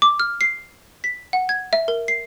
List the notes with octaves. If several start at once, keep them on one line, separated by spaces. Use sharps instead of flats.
D6
F6
C7
B6
F#5
G#6
E5
A#4
C7